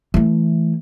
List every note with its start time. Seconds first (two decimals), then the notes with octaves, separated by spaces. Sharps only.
0.14 E3 A3